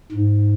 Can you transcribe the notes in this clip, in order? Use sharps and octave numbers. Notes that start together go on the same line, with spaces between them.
G#2